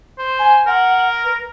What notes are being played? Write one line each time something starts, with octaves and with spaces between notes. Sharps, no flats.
C5
G#5
A#4 F#5
B4